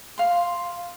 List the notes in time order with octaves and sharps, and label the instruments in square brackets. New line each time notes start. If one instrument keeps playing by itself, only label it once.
[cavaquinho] F5 C6